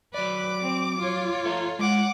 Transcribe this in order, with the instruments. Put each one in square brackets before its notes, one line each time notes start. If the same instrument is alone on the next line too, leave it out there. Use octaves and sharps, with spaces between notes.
[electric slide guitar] F#3 D5 [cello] B4 [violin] D6
[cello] C4
F4 C#5
[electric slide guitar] A4 E5 A#5
[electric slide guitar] G#3 [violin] F#5 D6